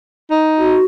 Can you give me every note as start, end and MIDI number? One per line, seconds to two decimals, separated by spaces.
0.31 0.81 63
0.58 0.85 66